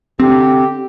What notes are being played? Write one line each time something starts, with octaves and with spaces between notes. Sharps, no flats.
D3 C4 G4